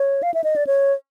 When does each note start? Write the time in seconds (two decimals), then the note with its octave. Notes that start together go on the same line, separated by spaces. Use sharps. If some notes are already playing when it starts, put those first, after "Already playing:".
Already playing: C#5
0.23 F5
0.34 E5
0.44 D#5
0.56 D5
0.67 C#5